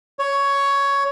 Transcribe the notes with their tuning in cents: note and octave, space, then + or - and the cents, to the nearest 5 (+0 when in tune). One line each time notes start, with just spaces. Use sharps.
C#5 +10